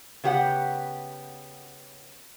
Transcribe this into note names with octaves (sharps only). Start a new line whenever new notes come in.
C#3 B3 G4 C#5 F#5